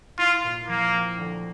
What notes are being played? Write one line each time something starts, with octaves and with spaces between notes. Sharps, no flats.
E4 F4
A#2
F3 A#3
C4
D2